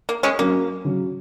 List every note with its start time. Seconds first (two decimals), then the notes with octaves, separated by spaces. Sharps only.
0.09 A#3
0.23 G#3 C#4
0.38 F#3 A#3 C#4
0.85 C#3 F#3 C#4